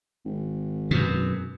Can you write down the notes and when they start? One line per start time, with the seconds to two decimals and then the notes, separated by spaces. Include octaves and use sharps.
0.25 G#1
0.91 F#2 B2